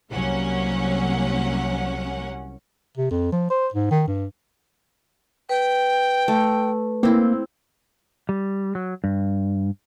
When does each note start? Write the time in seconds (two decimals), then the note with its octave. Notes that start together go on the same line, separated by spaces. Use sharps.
0.10 C2 F#3 A#3 C#4 F#5
2.97 C3
3.11 F2
3.32 F3
3.50 C5
3.74 G#2
3.91 D#3
4.08 G2
5.49 B4 G5
6.28 A3
7.03 A#3 C4 E4
8.29 G3
8.75 F#3
9.04 G2